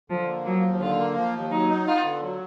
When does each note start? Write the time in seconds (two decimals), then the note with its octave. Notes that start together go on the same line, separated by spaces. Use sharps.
0.10 D3 F3
0.27 A#3
0.45 F3 F#3
0.63 D#2
0.80 D3 F4
0.98 A#3
1.16 F3
1.33 D#2
1.51 F#3 D#4
1.69 D#4
1.86 B3 F4
2.04 D3
2.22 F#3